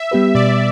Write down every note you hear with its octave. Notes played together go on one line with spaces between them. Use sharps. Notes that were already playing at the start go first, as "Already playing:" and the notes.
Already playing: E5
G3 B3 G4 B4
B2 D5